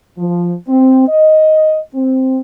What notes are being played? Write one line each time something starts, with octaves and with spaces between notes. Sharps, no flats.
F3
C4
D#5
C4